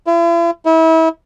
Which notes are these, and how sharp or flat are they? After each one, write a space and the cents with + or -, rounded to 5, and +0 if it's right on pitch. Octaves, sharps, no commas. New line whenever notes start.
E4 +45
E4 -30